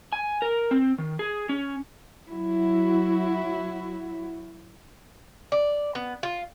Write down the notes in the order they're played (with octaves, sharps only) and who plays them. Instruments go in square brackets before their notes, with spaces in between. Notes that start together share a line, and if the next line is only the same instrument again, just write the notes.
[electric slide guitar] G#5
A#4
C4
D#3
G#4
C#4
[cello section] F#3 E4 F#4
[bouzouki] D5
B3
F4